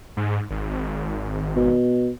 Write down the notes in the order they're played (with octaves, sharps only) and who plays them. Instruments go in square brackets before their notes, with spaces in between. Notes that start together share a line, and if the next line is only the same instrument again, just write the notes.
[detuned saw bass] G#2
G#1
G#1
[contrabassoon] B2